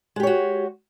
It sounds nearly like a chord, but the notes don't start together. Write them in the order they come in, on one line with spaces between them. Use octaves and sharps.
G#3 G4 C#5 F#4